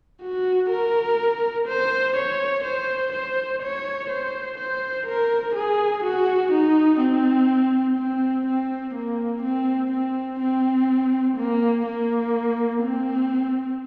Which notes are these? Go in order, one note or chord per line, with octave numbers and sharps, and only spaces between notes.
F#4
A#4
C5
C#5
C5
C5
C#5
C5
C5
A#4
G#4
F#4
D#4
C4
C4
C4
A#3
C4
C4
C4
A#3
A#3
C4